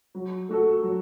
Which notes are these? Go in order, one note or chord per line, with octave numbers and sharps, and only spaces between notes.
F#3
A3 F#4 A4
F#3